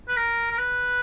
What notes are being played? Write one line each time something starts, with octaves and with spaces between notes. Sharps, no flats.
B4
A#4
A#4
B4